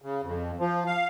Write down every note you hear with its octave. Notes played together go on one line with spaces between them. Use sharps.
C#3
F2
F3
F5